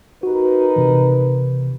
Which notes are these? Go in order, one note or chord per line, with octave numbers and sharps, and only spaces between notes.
D#4 F#4 A#4 B4
C3 E3